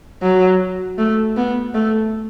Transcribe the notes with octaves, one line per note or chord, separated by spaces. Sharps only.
F#3
A3
B3
A3